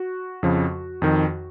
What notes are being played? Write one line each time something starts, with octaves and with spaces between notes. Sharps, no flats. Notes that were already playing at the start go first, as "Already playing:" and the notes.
Already playing: F#4
F2 C#3 F3
F2 D#3